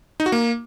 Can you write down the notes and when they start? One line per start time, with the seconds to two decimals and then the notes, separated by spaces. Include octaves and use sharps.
0.20 D#4
0.26 F#4
0.32 A#3